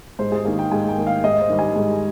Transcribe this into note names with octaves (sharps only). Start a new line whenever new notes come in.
G#2 C5
G#4
D#3 A#3 G#4
G5
G#2 G#5
G5
D#3 A#3
F5
G#2 D#5
C5
D#3 G3
G#5
G#2